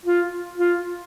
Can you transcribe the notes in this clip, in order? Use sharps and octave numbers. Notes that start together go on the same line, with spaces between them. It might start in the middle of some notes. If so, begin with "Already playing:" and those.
F4
F4